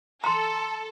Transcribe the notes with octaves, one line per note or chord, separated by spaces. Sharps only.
A4 A#5 C6